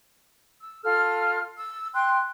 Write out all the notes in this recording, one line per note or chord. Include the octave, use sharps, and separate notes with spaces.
E6
F4 A4 F6
E6
G5 C6 F#6